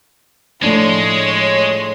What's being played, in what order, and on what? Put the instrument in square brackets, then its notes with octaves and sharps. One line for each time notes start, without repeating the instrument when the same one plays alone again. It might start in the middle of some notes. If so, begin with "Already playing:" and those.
[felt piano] A2 F3 D4 [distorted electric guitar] G#3 [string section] C#5 C6